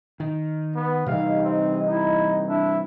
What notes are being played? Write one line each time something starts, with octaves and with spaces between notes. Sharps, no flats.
D#3
B3
C3 E3 G3 D#4 D#5 F5
C4
D#4 E4
D4 E4